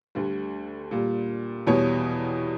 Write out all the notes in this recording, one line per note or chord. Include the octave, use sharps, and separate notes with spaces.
D2 D3 G3
A#2 G3
E2 B2 G3 C#5